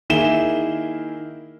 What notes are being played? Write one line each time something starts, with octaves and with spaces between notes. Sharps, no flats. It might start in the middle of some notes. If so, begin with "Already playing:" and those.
D#3 A#3 E4 G#4 E7 G7